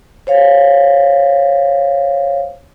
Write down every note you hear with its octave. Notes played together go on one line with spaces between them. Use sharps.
C5 C#5 F5